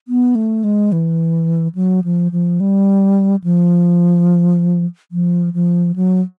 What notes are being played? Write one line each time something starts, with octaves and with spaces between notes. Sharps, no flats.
B3
A3
G#3
E3
F#3
F3
F3
G3
F3
F3
F3
F#3